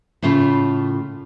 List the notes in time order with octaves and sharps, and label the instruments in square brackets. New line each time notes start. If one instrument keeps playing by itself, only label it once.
[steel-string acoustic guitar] A2 C#3 A3 F4